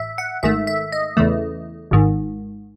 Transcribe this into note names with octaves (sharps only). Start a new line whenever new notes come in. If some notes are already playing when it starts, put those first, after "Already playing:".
Already playing: A1 E5
F#5
G#1 G#2 D#3 A3 E5
E5
D#5
E2 C#3 E3 A3
G#1 G#2 D#3